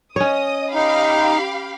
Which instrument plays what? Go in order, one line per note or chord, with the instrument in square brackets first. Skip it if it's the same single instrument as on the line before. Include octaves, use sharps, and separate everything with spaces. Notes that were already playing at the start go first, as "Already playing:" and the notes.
[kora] C#4 C#5 [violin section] D#5 D#6
[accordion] D#4 [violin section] G4 F5 B5